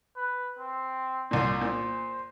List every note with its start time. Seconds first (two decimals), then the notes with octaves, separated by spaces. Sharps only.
0.17 B4
0.59 C4
1.31 C2 A#2 C6
1.61 A#2 C5